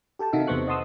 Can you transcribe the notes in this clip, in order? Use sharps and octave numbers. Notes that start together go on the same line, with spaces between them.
G4 A4 G5 A5
C3 D#3 D#4 F#4 E5 F5
E2 C3 B3 C5 C#6 F#6
D#5 F#5 A5 C6 D#6 E6